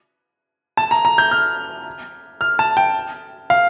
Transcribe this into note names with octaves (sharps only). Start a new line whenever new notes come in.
A5
A#5
A#5
G6
F6
F6
A5
G5
F5